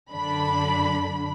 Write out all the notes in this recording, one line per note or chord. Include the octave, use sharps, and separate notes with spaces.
F#2 D3 D4 B5